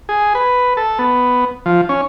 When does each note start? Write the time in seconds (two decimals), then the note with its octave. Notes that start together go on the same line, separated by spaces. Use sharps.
0.09 G#4
0.35 B4
0.77 A4
0.99 B3
1.66 F3
1.89 C#4